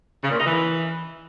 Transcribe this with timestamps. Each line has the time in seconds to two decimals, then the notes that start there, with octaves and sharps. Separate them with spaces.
0.23 C#3
0.31 A#2
0.39 D#4
0.46 E3